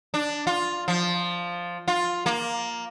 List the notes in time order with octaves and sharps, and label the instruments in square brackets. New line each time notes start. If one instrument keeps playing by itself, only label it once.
[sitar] D4
F4
F3
F4
A#3